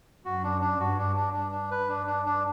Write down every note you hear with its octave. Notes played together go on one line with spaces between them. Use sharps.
F#2 F#4
D4
D4
G2 F#4
D4
D4
D4
D4
B4
G2 D4
D4
D4